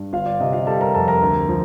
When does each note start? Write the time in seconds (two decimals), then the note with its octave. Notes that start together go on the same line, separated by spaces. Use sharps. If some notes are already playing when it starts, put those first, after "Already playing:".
Already playing: G2
0.13 G1 F4 F5
0.26 D5
0.40 C3 D#5
0.53 F4 F5
0.67 G3 A4 A5
0.81 A#4 A#5
0.94 F2 A4 A5
1.08 A#4 A#5
1.22 D2
1.49 F3